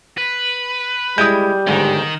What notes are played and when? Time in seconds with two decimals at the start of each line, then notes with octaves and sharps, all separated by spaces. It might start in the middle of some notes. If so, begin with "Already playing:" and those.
0.18 B4
1.18 G3 G#3 E4 D#6 G6
1.67 G1 D2 G#2 D#3